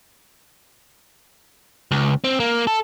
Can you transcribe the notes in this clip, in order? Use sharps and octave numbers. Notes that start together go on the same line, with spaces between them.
C#2
C4
A#3
A4